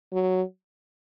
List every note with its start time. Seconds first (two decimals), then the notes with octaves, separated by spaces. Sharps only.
0.13 F#3